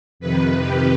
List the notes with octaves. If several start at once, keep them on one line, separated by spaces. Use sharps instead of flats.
F2 C3 D#3 B4
G4